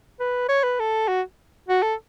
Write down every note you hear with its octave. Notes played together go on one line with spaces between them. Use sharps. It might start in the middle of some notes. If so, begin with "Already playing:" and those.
B4
C#5
B4
A4
F#4
F#4
A4